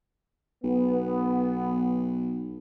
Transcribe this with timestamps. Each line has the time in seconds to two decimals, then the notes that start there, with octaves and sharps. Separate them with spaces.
0.63 B1 B3